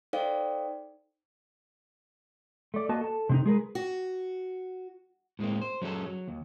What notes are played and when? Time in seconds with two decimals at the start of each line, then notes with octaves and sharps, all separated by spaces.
0.13 D#4 A4 C5 D5 F5 G5
2.74 A3 D5
2.89 A#3 F#4 B4 D#5 A5
3.01 A4 A5
3.29 C3 C4 D#4
3.46 G#3 G#4 A#4 B4
3.75 F#4
5.39 A2 G#3 A#3 C4
5.62 C5
5.82 F#3 C#4 G#4 A4
6.06 F#3
6.28 D#2